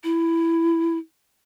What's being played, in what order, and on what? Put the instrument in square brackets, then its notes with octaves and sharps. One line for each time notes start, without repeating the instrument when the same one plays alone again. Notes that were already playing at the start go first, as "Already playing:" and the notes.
[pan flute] E4